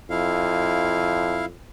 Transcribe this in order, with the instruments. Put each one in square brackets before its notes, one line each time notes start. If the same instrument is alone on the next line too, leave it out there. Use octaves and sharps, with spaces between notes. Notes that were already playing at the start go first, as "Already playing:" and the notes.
[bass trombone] F2 [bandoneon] E4 F5